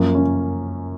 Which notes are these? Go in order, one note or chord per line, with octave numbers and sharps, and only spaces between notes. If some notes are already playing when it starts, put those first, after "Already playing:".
Already playing: F#2 F3 A#3
C#4